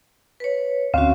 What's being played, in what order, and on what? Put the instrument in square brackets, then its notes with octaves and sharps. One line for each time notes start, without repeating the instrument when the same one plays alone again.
[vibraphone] B4 C#5
[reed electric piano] D2 F5 [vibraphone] C4 C#4 F#4